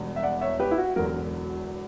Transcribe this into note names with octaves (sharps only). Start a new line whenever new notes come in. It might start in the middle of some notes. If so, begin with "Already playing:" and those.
Already playing: E1 E2 B2 G3
E5
D5 F#5
C#5 E5
G4 B4
E4
F#4
E1 E2 D3 F#3 F#4 A#4